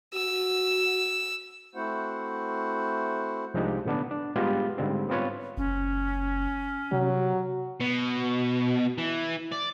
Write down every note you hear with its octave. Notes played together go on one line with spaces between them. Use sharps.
F#4 E6
A3 C4 E4 F#4 C5 F#5
C2 F3 G#3 D4 D#4 G4
A2 D3 B3 D4
D4
G#2 G3 G#3 B3 F4 G4
G#2 D3 G3 C4
B3 C4 F4 B4 C#5
F#1 C#4
C3 F#3
B2
E3
D5